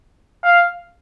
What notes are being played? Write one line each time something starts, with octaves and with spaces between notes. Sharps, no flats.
F5